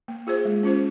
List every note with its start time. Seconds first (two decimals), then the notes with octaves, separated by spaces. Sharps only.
0.08 A#3
0.27 F4 G#4 C5
0.45 G#3
0.63 C#4 F4 C5